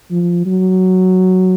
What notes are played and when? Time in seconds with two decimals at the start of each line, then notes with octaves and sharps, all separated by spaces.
0.11 F3
0.46 F#3